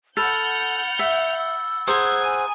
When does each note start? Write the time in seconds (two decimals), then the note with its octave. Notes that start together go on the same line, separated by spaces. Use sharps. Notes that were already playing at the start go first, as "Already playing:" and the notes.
0.17 A4 F#5 B5 F6 G6 A6 F7
0.99 E5
1.39 E6
1.87 G#4 C5 F#5 A#5 D#6 G#6
2.22 G#5